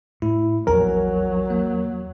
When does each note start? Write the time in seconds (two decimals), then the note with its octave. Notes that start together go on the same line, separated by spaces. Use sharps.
0.22 A2 E4
0.67 A#1 E2 F#3 A#4 G#5 A#5
1.50 A#3